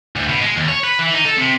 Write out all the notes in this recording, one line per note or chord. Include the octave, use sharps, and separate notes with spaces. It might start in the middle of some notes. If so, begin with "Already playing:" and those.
D2
B2
G#3
D#2
C#5
B4
E3
D#4
A4
C3